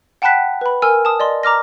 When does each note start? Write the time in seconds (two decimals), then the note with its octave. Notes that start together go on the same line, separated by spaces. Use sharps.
0.22 F#5 G5 A5 B5 F#6 B6
0.61 B4 B5
0.82 A#4 G#5 E6 F6
1.05 A5 D#6
1.20 D5 D#5 C6
1.43 A#5 D6 F6 A#6